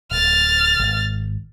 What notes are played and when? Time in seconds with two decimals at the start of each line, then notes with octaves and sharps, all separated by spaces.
0.11 D1 F6 A6
0.79 G#1